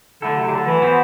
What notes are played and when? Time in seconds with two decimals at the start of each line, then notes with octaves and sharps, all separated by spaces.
0.22 D3 F#3 A3 E4 A4
0.37 C3
0.47 C3
0.51 D3
0.67 E3
0.82 B3 F#4 C5